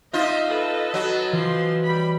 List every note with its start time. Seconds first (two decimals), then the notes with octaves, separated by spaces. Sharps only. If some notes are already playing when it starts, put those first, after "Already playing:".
0.13 D#4 F4 D#5 E5
0.50 A4 B4 D#5
0.94 F#3
1.32 E3 F3 C6
1.83 G3 B5